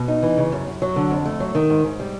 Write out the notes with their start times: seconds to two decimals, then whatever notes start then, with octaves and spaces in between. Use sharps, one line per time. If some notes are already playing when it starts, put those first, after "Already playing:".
Already playing: B2
0.08 D#4
0.22 E3
0.37 C#3
0.52 F#2
0.67 F#2
0.82 F#3
0.96 D3
1.11 F2
1.26 A3
1.40 F#3
1.55 D#3
1.70 G#2
1.85 G#2
2.00 G3